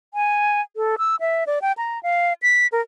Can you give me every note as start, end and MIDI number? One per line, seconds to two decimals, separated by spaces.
0.14 0.61 80
0.77 0.95 69
0.98 1.16 88
1.20 1.44 76
1.47 1.59 74
1.62 1.72 79
1.77 2.01 82
2.03 2.33 77
2.42 2.67 95
2.72 2.81 70